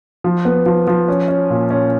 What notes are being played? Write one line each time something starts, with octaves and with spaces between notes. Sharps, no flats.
F3
B3
F3
F3
C#4
C#4
A#2
C#4